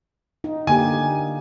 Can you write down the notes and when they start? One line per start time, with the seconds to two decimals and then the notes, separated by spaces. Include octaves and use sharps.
0.44 D#4
0.67 D3 A#3 G4 G#5